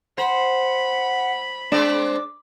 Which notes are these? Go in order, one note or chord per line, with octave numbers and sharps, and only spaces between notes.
C5 F#5 B5
G#3 C4 D4 D5 D6